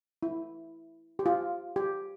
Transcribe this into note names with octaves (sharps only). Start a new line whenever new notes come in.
E4
G4
F4
G4